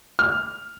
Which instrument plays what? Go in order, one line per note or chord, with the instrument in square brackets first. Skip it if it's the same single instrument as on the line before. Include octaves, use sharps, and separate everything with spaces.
[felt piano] F6